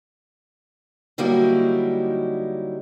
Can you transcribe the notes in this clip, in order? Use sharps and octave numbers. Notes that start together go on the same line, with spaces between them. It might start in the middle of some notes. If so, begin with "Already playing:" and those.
D3 F#3 G3 A#3 D#4 E4